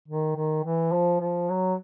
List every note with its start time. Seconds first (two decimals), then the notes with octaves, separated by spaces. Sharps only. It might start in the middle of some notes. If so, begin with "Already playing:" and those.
0.08 D#3
0.36 D#3
0.64 E3
0.92 F3
1.21 F3
1.49 F#3